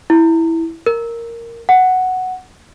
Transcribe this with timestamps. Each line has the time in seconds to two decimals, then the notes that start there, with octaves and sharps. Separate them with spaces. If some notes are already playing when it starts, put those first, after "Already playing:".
0.10 E4
0.86 A#4
1.69 F#5